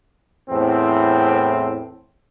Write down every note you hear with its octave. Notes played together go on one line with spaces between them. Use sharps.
E2 A2 C4